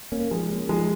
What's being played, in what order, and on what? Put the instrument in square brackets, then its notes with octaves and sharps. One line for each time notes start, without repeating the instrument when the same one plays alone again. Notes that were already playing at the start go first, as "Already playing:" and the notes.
[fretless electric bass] A#3 C#4
[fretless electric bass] F3 [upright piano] G#3
[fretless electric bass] A#3 C#4
[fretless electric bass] F3 [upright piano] G#3